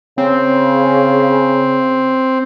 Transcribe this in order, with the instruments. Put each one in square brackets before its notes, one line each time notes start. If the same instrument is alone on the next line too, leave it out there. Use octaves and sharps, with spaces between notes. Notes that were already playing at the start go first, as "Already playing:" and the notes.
[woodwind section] C#3 [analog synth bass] C4